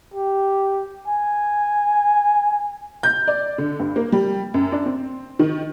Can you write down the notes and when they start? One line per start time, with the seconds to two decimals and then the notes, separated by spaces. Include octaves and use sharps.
0.14 G4
1.08 G#5
3.03 G6
3.28 D5
3.58 D3
3.79 G2
3.96 A#3
4.12 G3
4.54 F#2
4.72 D4
4.86 C4
5.39 D#3